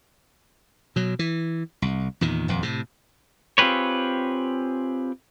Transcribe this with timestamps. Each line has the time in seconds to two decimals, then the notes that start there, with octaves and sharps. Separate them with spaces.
0.96 B2 F#3
1.19 E3
1.82 C2
2.21 E2 A#2 D#3
2.48 D#1 F2
2.62 A2 C3
3.58 C4 F4 G4 G#4 B4 C#5